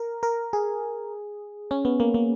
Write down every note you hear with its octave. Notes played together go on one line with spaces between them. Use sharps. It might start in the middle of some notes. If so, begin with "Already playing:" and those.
Already playing: A#4
A#4
G#4
C#4
B3
A#3
A#3